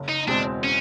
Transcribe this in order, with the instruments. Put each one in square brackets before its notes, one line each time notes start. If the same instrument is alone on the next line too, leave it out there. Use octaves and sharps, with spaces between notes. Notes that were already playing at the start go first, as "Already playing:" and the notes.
Already playing: [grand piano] F#1
[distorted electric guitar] D#4
[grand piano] E2 B2 G#3 C4 [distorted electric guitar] D4
[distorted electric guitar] C#4